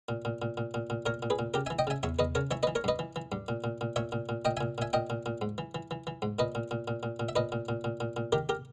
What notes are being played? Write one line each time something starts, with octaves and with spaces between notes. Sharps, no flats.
A#2
A#2
A#2
A#2
A#2
A#2
A#2 A#4 C#5
A#2
G#4 B4
A#2
C#3 G4 A#4
E5 G#5
E3
D#5 G5
C#3 E5 G#5
E2 C#5 E5
E2 B4 D#5
C#3 A#4 C#5
E3 C#5 E5
B4 D#5
E3
A#4 C#5
G2 B4 D#5
E3
E3
G2
A#2
A#2
A#2
A#2 C#5 E5
A#2
A#2
A#2 D#5 G5
E5 G#5
A#2
A#2 E5 G#5
A#2 D#5 G5
A#2
A#2
G#2
E3
E3
E3
E3
G#2
A#2 B4 D#5
A#2
A#2
A#2
A#2
A#2
E5
A#2 B4 D#5
A#2
A#2
A#2
A#2
A#2
D#3 G4 A#4
G4 A#4